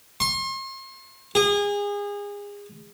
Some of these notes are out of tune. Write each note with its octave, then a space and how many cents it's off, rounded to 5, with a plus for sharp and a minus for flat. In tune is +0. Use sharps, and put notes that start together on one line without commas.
C6 +40
G#4 -30